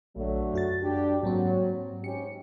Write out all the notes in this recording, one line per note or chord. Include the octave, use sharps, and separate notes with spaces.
A#1 D3 F#3 A3
F#2 F#4 A6
G3 D4 G4
G#2 F#3 A#3 C4
G#2 C#4 G4 C#7